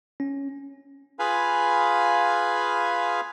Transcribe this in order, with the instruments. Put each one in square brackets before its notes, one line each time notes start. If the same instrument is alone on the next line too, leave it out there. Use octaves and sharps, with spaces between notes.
[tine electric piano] C#4
[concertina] F4 G#4 B4 F5 G#5 B5